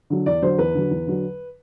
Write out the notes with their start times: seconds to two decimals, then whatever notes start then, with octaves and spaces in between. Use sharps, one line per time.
0.10 D3 F#3
0.26 E2 D5
0.42 D3 F#3 C5
0.58 E2 B4
0.75 D3 F#3
0.91 E2
1.07 D3 F#3